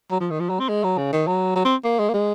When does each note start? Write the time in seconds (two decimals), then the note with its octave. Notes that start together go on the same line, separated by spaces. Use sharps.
0.11 F#3
0.20 F3
0.30 D#3
0.40 F3
0.49 F#3
0.59 C4
0.69 G#3
0.84 F#3
0.98 C#3
1.13 D#3
1.27 F#3
1.56 F#3
1.65 C4
1.84 A#3
1.99 G#3
2.09 A#3
2.13 G#3